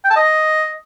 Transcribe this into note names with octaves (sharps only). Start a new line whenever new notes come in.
G5
A5
D#5